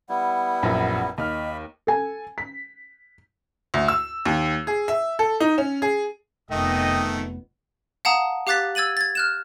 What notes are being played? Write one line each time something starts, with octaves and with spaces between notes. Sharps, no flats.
G3 B3 E4 F#5
A#1 F#2 F3
D#2 D#5 B5 F6
A4 G#5
B6
D2
E6
D#2
G#4
E5
A4
D#4
C#4
G#4
F1 D#3 A3 B3 D#5 G5
F5 F#5 A5 A#5 D#6
G4 F5 D6 F#6 A6 B6
E6 G#6 A6 D#7 F#7
G#6 A6
F6 F#6 E7